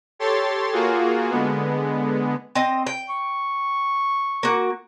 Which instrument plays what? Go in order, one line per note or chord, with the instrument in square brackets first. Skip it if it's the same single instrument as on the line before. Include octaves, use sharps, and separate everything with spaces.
[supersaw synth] G4 A4 C#5 C6 A6
A#3 F4 F#4 G#4
D3 G#3 B3
[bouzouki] C4 D#5
G5
[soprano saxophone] C#6
[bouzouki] A#3 F#4